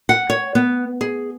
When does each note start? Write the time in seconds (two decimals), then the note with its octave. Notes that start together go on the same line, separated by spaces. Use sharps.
0.09 F#5
0.30 C#5
0.55 B3
1.01 G#4